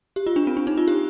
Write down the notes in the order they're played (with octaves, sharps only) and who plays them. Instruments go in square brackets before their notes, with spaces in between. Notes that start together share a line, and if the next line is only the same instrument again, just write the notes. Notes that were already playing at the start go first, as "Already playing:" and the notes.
[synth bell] G4
F4
D4
C4
D4
D#4
F4
G4